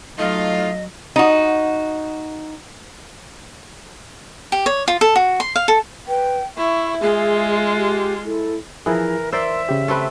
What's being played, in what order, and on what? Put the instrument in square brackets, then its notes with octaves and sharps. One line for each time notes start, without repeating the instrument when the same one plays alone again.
[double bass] F#3 [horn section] A3 D#4 F4 [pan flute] D#5 [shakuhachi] F5
[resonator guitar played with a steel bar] D#4 F#4
[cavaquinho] G4
C#5
F4
A4
F#4
C6
F5
A4
[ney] B4 [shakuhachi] G5
[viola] E4 [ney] E5 [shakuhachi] C#6
[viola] G#3 F4 [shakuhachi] G#4
[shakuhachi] G4
[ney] E4 [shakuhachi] A4
[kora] E3 [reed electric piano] F3 E4 G#4 [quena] A#4
[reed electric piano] A#4 C6 E6 [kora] C5 D5 [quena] E5
[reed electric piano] C#3 G4
[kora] A3 C4 B4